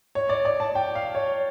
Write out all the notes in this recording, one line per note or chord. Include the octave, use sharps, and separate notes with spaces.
C#5
D5
D5
A5
G5
F5
C#5